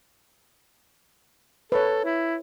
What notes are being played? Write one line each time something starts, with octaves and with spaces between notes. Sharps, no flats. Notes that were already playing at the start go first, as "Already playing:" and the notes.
A4 B4 C#5
E4